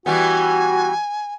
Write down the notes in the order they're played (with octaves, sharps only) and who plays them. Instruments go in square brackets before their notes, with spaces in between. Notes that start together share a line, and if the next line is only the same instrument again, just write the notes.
[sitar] E3 G3 B3 [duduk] F#4 [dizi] G#5